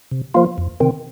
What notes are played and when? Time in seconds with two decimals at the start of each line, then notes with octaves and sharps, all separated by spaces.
0.11 C3
0.34 F3 A#3 F4
0.58 F2
0.80 C3 D#3 C4